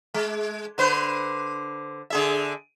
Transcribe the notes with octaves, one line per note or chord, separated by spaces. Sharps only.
G#3
D3 B4 C5
D3 G#4 E5